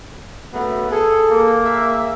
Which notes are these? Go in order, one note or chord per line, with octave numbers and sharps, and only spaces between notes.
C#3 F#3 A3 B3
G#4 A4
A#3
G#4 E5